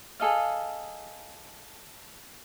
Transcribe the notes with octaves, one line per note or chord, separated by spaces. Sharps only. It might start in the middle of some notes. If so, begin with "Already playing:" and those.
G#4 A4 D#5 F5